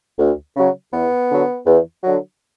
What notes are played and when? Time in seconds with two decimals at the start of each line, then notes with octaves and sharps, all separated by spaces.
0.19 D2
0.56 C#3 F#3
0.93 E2 B3
1.30 D3 F#3
1.66 E2
2.03 D3 F#3